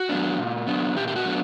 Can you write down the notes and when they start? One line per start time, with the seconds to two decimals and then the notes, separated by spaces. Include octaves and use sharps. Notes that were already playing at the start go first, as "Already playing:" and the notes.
Already playing: F#4
0.09 F#3 B3 D4
0.39 A#2
0.67 F#3 B3 D4
0.96 A#2 G4
1.08 G4
1.16 F#4
1.25 F#3 B3 D4